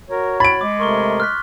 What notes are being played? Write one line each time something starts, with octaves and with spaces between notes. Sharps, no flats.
F#4 A#4 C#5
A2 B5 G#6 A6 D7 F#7
G#3 D6
C3 A3 A#4 C6 C#6 G7
F6 F#6 B6